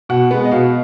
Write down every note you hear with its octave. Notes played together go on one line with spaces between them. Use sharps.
B2 F#5
G#3 B3
D#5
B2 F5